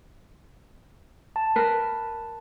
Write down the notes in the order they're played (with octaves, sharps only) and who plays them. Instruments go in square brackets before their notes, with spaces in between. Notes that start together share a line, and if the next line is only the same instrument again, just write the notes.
[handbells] A5
[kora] A#4 B4